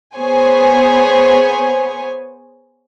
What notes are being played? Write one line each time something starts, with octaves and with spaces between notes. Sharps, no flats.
B3 G#4 C5 C#5 G#5